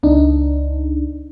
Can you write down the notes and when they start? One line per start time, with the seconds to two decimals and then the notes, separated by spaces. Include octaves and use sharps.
0.03 C#2 D4 D#4